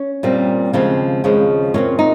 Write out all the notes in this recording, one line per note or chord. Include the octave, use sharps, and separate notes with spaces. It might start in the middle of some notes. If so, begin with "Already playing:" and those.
Already playing: C#4
A#2 G3 C4
D#2 C#3 F3 G#3 C4
D#2 C#3 F3 G#3
A#2 G#3 C4 C#4
D#4